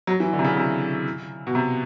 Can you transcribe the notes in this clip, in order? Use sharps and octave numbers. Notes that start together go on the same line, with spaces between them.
F#3
E3
D3
C3
C#3
C3
B2
C3